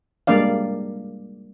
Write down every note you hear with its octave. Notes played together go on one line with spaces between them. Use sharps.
G3 G#3 A#3 D4 D5 F5